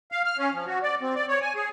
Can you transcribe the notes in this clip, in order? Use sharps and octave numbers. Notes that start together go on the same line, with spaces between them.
F5
F6
C#4
F3
F#4
D5
C4
D5
C#5
G#5
G#4